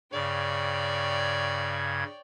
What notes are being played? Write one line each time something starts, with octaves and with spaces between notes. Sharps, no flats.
G2 C#3 C#5 D5 G5 G#6